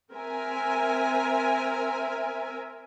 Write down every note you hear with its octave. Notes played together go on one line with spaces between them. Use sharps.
C4 A#4 E5 G#5